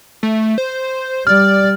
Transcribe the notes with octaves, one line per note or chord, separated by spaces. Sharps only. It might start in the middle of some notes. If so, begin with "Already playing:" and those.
A3
C5
G3 D5 F6